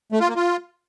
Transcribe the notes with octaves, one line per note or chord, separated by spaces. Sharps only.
A3
F4
A#3
F4